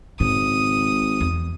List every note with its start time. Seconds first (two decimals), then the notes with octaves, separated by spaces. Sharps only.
0.20 G#1 G#2 C#3 D#6
1.20 E2